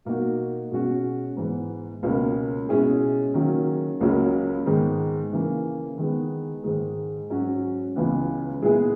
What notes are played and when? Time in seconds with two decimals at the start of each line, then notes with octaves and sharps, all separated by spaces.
0.05 B2 A#3 D#4 F#4
0.71 B2 G#3 C#4 F#4
1.37 G#2 E3 B3
2.03 C#2 B2 A#3 C#4
2.69 B2 G#3 C#4 E4 G#4
3.34 D#3 F#3 A#3 C#4
4.01 C#2 C#3 F#3 A#3 C#4
4.66 G#2 D#3 G#3 B3
5.32 C#3 E3 A#3
5.98 D#3 G#3 B3
6.64 G#2 D#3 G#3
7.30 G#2 F#3 C#4 F#4
7.96 C#2 C#3 E3 B3
8.62 A#2 G#3 B3 E4 G#4